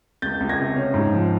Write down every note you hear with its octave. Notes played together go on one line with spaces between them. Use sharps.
C#2 G6 A6
C#2
G#6 A#6
C3
C#4
G#2
F3